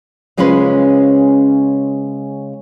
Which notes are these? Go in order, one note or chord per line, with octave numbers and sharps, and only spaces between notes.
C#3 G#3 C#4 F4 B4 C5